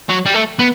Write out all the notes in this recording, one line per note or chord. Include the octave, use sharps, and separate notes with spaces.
F#3
G3
A3
B3